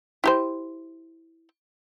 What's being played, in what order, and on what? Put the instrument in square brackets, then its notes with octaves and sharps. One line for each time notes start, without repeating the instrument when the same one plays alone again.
[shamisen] E4 G4 C5